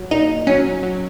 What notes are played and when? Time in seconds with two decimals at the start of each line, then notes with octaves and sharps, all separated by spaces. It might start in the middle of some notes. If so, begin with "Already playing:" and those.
Already playing: F#3
0.11 A#2 D#4
0.47 F#3 C#4
0.83 F#3